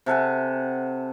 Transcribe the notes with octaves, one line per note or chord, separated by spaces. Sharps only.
C3 A4 F#5 G#5